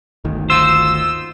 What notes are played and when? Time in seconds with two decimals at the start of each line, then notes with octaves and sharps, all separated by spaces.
0.25 G1 D2 D#3
0.50 D#4 F4 C5 E6